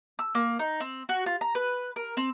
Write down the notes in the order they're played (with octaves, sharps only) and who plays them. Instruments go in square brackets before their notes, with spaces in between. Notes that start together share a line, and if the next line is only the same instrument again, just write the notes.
[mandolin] E6
A#3
D#4
C4
F#4
F4
A#5
B4
A#4
C4